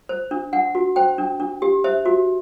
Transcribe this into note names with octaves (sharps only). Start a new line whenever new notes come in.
C5
D4
D4 F#5
F#4
C5 G5
D4
D4
G4
C5 E5
F#4